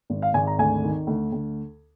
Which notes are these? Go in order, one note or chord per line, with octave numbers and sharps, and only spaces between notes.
G#1
F5
G#1 G#5
A#5
D2 G#5
D#3
D2
D2